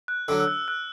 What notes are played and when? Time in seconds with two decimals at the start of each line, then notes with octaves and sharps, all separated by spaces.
0.08 F#6
0.28 D3 F#3 E6
0.40 E6
0.48 F#6
0.68 F#6